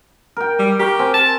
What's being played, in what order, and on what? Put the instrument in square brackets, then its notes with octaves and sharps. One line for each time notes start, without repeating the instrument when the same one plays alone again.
[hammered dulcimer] A#4 G5
[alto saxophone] G3
[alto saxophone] G4 [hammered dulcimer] A#4 C#6
[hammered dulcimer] C4 G#5
[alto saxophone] A5